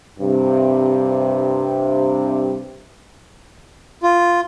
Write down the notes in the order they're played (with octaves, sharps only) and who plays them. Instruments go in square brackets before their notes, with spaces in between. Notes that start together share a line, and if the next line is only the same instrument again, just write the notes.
[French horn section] G2 C3
[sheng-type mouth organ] F4